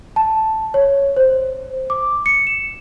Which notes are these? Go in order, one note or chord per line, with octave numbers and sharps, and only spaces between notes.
A5
C#5
C5
D6
C#7
E7